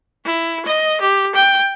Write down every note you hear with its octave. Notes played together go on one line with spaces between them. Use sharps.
E4
D#5
G4
G5